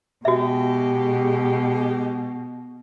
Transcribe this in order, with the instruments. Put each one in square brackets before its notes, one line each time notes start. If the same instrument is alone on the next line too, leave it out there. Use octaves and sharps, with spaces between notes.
[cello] B2 [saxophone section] G#3 G4 [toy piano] F#4 E5